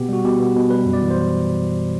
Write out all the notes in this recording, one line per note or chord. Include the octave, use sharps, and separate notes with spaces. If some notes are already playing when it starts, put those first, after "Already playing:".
Already playing: B2 B3 G4
G3 F#4
B2 G4
B3
B2
G3 B4
F#2
D5
E3
C5